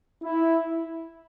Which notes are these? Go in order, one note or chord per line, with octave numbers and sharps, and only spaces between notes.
E4